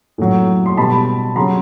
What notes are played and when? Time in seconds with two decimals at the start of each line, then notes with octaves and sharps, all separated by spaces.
0.18 A2 F#3
0.66 C6
0.77 B2 G3 A5 B5
1.36 C#3 F#3 A#5 C6